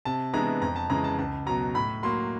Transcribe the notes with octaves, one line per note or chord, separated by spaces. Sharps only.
C3 A5
E3 G#3 B3 D4 A#5
F2 A#5
A5
C#3 E3 G#3 A#5
A5
C#2 A5
B2 F#3 A#5
A2 B5
F#3 A#3 C6